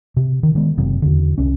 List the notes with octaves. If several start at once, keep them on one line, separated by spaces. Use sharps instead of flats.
C3
D#3
D#3 G#3 B3
F#1 C3 F#3 C4
E2 D3
C2 C#4